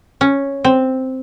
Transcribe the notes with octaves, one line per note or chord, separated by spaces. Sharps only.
C#4
C4